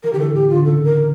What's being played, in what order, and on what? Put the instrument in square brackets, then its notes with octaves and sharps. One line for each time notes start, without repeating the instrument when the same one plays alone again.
[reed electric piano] E3 [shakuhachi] A#4
[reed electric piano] D3 [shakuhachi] G4
[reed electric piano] E3 [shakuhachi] A4
[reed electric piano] A2 [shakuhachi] G4
[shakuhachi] F4
[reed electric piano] D3
[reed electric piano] C#3 [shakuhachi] A4
[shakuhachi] A#4